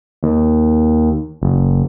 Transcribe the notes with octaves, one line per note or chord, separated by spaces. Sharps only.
D#2
F#1